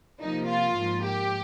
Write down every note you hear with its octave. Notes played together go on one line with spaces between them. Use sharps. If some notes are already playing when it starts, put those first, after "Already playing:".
C3 F3 A#3 D#4
F4
G#2 F3 A#3
G4